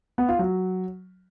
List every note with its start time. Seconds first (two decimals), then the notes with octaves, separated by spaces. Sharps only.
0.18 B3
0.29 F4
0.39 F#3